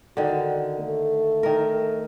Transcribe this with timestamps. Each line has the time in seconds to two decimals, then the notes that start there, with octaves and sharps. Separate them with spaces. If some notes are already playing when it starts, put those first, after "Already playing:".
0.17 D3 D#3 F#4
0.80 A3
1.43 D#3 A#4